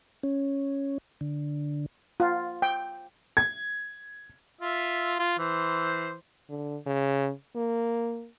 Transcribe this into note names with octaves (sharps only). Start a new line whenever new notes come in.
C#4
D3
F4
G5
G#6
F4 E5
F4
E3 C5
D3
C#3
A#3